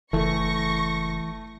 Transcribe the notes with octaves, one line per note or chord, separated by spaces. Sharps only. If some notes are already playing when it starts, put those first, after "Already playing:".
F#1 E3 A3 C#6 A#6